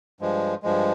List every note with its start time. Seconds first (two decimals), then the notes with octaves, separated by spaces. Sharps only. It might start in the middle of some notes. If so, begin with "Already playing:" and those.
0.21 G2 F3 G#3
0.63 G2 F3 G#3